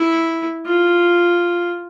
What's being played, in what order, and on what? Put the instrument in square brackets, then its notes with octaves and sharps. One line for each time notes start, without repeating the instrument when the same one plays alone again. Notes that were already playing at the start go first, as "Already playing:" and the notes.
Already playing: [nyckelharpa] E4
F4